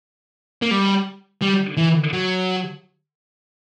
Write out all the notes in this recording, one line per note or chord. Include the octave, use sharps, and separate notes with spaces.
A#3
G3
G3
E3
F#3